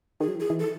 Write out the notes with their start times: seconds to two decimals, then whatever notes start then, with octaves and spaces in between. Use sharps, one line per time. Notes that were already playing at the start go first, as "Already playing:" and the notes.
0.20 D#3 G#4
0.28 F#3
0.35 E3 G#4
0.50 E3
0.59 A4